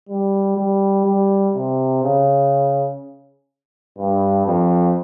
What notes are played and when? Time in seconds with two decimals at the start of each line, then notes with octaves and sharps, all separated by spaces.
0.09 G3
0.57 G3
1.05 G3
1.55 C3
2.03 C#3
3.98 G2
4.46 F2